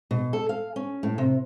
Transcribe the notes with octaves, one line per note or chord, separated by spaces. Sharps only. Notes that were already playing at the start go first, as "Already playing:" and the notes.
B2
A4
F5
C#4
A2
C3